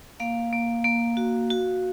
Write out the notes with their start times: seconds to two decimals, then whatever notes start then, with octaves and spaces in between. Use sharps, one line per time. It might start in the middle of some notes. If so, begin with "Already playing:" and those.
0.20 A#3 F5
0.53 A#3
0.84 A#3
1.17 F#4
1.51 F#4